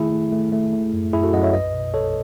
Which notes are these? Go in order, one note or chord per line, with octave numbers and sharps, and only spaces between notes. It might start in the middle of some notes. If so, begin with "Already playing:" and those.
Already playing: D#3 A3 E4 G#4
A3
A3
A3
A3
F#2
F#2 E4 G#4
F#4 A4
F#2 D#5 F#5
C#5 E5
B1 B4 D#5
B2
B1 A4 C#5